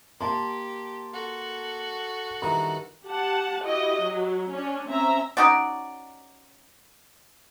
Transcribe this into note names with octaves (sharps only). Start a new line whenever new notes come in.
A#3 G4 A5 C6
F#4 A4
G2 D#3 E3 A#5
G4 F#5 A5
E4 F#4 G4 D#5
F#3
C#4 D4
C4 C#4 E5 A#5
C#4 D#4 F#4 D5